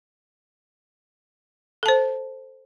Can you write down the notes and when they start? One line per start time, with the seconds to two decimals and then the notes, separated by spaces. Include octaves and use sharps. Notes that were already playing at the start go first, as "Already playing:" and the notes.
1.83 A4
1.86 A5
1.88 C5